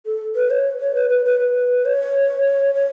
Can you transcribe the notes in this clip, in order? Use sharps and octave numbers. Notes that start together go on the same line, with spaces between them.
A4
B4
C#5
C#5
B4
B4
B4
B4
C#5
C#5